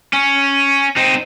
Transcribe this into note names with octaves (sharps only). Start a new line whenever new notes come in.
C#4
C4 D#4